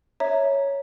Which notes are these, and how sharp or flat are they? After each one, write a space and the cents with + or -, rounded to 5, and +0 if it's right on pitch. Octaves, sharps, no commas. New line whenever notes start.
C#5 +0 E5 -15 A#5 +0